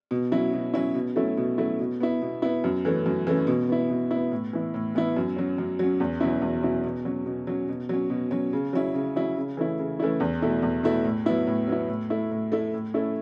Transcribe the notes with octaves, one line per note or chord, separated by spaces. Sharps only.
B2
F#3 C#4 E4
B2
F#3 C#4 E4
B2
F#3 A3 C#4 E4
B2
F#3 A3 C#4 E4
B2
B3 E4
B2
B3 E4
F#2
E3 A3 C#4
F#2
E3 A3 C#4
B2
B3 E4
B2
B3 E4
A2
E3 B3 E4
A2
E3 B3 E4
F#2
F#3 C#4
F#2
F#3 C#4
E2
B2 F#3 C#4 E4
E2
B2 F#3 C#4 E4
B2
F#3 C#4
B2
F#3 C#4
B2
F#3 C#4
B2
F#3 C#4
C#3
F#3 C#4 E4
C#3
F#3 C#4 E4
C#3
E3 A3 C#4 E4
C#3
E3 A3 C#4 E4
E2
B2 A3 E4
E2
B2 A3 E4
A2
F#3 B3 E4
A2
F#3 B3 E4
A2
A3 E4
A2
A3 E4
A2
A3 C#4 E4